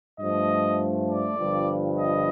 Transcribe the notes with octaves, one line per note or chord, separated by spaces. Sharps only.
G2 F3 A3 D#5
D5
G1 G2 F3
D#5